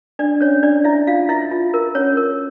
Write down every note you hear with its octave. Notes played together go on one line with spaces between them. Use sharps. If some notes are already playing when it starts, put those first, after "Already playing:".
D4 D5
C#4 C#5
D4 D5
E4 E5
F4 F5
E4 E5
F4
A#4
C#4 C#5
A#4